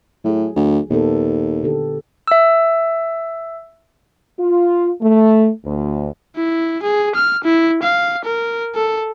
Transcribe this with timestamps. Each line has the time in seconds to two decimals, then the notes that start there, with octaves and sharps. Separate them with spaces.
0.24 A2 F#3 G#4
0.56 D2
0.90 D#2 A#2 B3 A4
1.63 D3 G4 A4
2.28 E5 E6
4.38 F4
5.01 A3
5.65 D2
6.37 E4
6.83 G#4
7.15 F6
7.44 E4
7.83 F5
8.25 A#4
8.75 A4